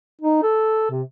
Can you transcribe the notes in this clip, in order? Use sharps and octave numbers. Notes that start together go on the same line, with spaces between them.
D#4
A4
C3